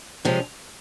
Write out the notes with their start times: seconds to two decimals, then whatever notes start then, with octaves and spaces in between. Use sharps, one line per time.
0.25 C3 F3 G#3 C#4